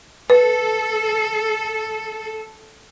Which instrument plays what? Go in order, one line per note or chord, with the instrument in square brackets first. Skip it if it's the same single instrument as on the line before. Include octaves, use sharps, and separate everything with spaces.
[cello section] A4 [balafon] B4